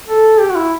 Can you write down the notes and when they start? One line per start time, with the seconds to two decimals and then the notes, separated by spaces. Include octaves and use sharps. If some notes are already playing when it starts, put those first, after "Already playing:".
0.09 A4
0.40 G4
0.50 F#4
0.56 E4